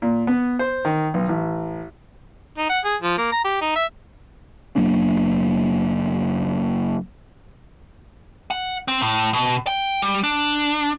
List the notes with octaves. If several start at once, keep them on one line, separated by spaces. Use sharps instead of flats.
A#2
B3
C5
D#3
B1
A1
D#4
F#5
G#4
F3
A#3
A#5
G4
D#4
E5
F#1 F#3 A#3 D4
F#5
C4
A2
B2
G5
G3
D4